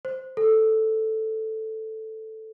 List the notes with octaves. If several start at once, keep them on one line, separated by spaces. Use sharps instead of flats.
C5
A4